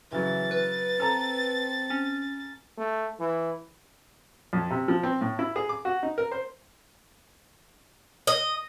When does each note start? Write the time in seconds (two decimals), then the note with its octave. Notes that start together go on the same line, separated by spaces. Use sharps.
0.12 C#3 E3 F#3 A6
0.51 B4
1.00 C4 A4 A5 A#5
1.90 C#4
2.78 A3
3.20 E3
4.53 F2
4.70 C3
4.88 F3
5.03 C4
5.21 A2
5.39 E4
5.56 G#4
5.69 D6
5.85 F#4
6.03 D#4
6.18 A#4
6.31 C5
8.27 D#5